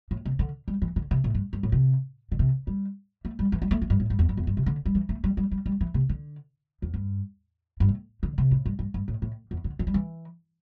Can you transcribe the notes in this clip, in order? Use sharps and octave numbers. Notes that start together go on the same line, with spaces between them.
A2
C3
D3
G3
E3
D3
C3
A2
G2
G2
A2
C3
D3
C3
G3
A3
G3
E3
G3
A3
A3
G2
A2
G2
E2
G2
E2
G2
C3
D3
G3
E3
A3
G3
G3
G3
G3
E3
C3
D3
E2
G2
G2
A2
D3
C3
A2
G2
G2
G2
A2
A2
E2
D3
E3
G3
E3